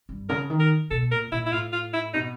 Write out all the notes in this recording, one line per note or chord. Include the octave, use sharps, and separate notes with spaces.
G2
C#3 A#4
D#3
A#4
B2 A4
A#2 A#4
A#2 E4
E4
A2 F4
F4
E4
B2 D#4